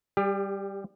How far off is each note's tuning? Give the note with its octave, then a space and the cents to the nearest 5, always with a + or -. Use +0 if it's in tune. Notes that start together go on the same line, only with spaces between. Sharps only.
G3 +0 G4 +40